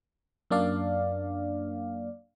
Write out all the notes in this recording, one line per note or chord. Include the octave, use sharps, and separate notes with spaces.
F#2 A#3 D4 D5 F5